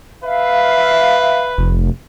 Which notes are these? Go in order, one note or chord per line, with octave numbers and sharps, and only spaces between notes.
B4 E5 F5
F1